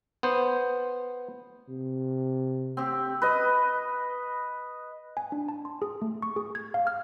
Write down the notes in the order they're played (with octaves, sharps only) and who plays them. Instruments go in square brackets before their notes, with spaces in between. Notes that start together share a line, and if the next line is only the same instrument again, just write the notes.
[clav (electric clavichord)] B3 C5
[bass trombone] C3
[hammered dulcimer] C4 G4
B4 D#5
[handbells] G#5
D4
A5
C6
G#4
A3
C#6
G#4
G#6
F5
F6